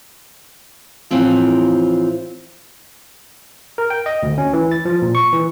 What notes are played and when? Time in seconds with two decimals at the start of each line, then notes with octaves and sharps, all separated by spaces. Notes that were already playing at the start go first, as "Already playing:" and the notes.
1.11 A2 E3 F3 C4 F4
3.78 A#4
3.90 G5
4.06 D#5
4.23 D2
4.38 C#4
4.53 E3
4.71 A6
4.85 F3
5.02 A#2
5.15 C#6
5.33 E3